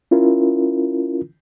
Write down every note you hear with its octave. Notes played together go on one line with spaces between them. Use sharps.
C#4 E4 F4 A#4